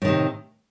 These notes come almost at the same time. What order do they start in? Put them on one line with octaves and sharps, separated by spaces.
A2 D#3 C3